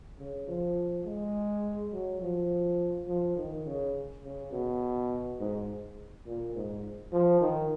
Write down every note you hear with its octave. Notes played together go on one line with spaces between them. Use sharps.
C#3
F3
G#3
F#3
F3
F3
D#3
C#3
C#3
B2
G#2
A#2
G#2
F3
D#3